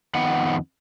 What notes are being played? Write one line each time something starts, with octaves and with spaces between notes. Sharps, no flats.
F2 D#3 B3 F#5